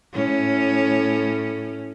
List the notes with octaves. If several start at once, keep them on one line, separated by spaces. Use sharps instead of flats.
A2 C#4